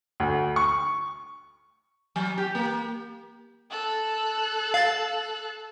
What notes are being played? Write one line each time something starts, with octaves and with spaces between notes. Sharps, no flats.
D2
C#6
F#3
G4
A#3
A4 F#6
F5 A6